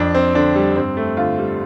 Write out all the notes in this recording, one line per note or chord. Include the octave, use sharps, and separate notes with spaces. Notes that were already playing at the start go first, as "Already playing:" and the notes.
Already playing: F2 D4
C4
D3 D4
G3
G2 C4
A3
D3 F4
G3